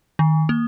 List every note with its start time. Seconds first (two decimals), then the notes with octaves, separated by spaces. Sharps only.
0.19 D#3
0.49 A#3